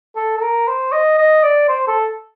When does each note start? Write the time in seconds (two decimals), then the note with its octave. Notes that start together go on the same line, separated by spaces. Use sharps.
0.16 A4
0.37 A4
0.41 A#4
0.67 C5
0.92 D#5
1.18 D#5
1.43 D5
1.68 C5
1.88 A4